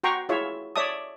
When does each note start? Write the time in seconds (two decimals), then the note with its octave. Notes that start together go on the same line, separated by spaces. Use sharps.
0.04 F#4 F#5 G5 A#5 C6 C#6
0.29 E4 F4 G#4 C#5 E5
0.76 C#5 D5 E5 A5 D#6